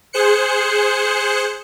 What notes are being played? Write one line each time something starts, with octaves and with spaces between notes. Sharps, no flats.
G#4 C5 F#6 C#7